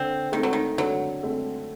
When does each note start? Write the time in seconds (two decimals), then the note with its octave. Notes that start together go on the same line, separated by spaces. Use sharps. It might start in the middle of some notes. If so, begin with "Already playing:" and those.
Already playing: D3 C4
0.32 D#3 A3 C4
0.43 F#3
0.53 D#3
0.78 D3 F#3
1.23 A3 C4